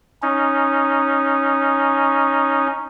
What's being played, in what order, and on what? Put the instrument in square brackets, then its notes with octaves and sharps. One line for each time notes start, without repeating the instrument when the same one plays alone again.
[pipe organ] C#4 D#4